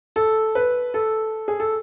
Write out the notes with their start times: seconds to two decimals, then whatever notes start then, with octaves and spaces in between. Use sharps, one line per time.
0.16 A4
0.55 B4
0.94 A4
1.48 G#4
1.60 A4